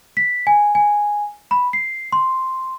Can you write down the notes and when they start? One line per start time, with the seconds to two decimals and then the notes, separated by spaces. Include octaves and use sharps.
0.17 B6
0.47 G#5
0.75 G#5
1.51 B5
1.73 C7
2.12 C6